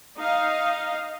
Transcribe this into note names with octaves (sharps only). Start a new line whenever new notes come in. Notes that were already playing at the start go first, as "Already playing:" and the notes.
D#4 D#5 F5